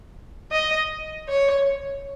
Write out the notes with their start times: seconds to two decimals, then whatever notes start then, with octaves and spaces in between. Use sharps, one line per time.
0.52 D#5
1.29 C#5